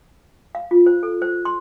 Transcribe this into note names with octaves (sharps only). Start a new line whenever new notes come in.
F5
F4
C5
A4
C5
C6